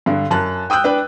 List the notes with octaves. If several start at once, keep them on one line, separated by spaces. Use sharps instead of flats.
G2 D3
F#2 A5 F#6
G5 D#6 E6 F#6 G6
D4 B4 G5